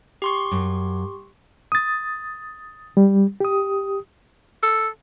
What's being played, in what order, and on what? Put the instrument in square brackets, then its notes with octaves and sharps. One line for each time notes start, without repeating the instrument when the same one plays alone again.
[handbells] G4 C6 C#6
[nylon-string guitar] F#2
[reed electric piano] D#6 A6
G3
G4 D#6
[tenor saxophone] A4